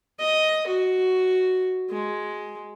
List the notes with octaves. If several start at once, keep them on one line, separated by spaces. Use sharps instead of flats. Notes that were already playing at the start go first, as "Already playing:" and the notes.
D#5
F#4
G#3